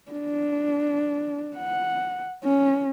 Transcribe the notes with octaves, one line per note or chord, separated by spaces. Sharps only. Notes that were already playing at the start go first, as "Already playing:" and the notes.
D4
F#5
C#4